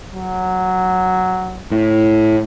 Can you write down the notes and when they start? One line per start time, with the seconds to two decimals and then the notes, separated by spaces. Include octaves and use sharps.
0.13 F#3
1.71 A2